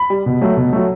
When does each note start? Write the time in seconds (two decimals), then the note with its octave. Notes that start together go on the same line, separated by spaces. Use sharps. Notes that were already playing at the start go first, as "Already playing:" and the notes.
Already playing: B5
0.10 G3
0.26 B2
0.41 F#3 A3
0.57 B2
0.73 F#3 A3